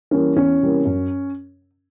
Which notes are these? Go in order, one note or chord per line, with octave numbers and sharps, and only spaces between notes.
E3 G3 A#3 C#4
E2 C#4
C3 E3 G3 A#3
F#2